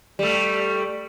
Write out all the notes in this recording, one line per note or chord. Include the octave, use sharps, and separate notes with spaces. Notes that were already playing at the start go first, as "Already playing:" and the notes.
G3 A3